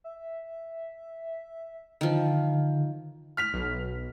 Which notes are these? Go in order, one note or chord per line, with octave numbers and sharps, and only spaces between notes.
E5
D3 D#3 F3
F6 B6 F7
B1